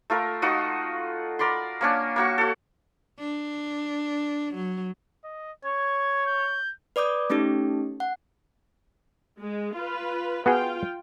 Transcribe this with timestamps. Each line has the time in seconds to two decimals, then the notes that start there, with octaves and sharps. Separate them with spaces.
0.10 A3 F4 A#4
0.42 D#4 F4 F#4 D#5
1.39 A#4 D5 B5 C6
1.81 A#3 C#4 D4
2.16 A#3 F#4 C#6
2.38 F#4 A4
3.19 D4
4.55 F#3
5.24 D#5
5.65 C#5 G#6
6.27 G6
6.96 B4 D5 D6 D#6 G6
7.30 A3 C#4 D#4 G4 A4
8.00 F#5
9.39 G#3
9.76 F4 B4
10.46 B3 F4 F#4 G#4 G5